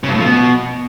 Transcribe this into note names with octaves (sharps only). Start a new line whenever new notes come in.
C#3
G2
A2
F3
B2